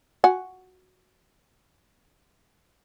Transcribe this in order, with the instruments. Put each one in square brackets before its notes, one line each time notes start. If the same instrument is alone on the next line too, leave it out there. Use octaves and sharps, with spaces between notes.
[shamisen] F#4 F#5 G#5